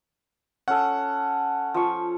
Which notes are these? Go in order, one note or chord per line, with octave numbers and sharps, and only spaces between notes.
C#4 A4 F#5
F3 C#6